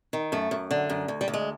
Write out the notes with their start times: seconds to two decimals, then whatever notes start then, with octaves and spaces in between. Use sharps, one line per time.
0.13 D#3
0.32 F#2 A3
0.51 F#2
0.71 D3
0.90 F#2
1.08 D2
1.21 G3
1.28 D2
1.34 G#3